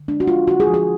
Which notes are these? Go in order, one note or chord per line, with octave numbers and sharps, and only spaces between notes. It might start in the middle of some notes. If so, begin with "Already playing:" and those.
Already playing: D3
G#3 D4
F#4
G#3 F4
D3 F#4
G#4
F3
G#4